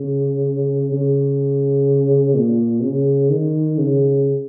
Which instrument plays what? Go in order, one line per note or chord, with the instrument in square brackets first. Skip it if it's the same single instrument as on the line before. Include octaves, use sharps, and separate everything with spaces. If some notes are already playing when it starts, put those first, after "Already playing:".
Already playing: [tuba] C#3
C#3
A#2
C#3
D#3
C#3